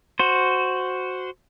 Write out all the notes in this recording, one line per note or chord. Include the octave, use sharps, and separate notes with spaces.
F#4 C5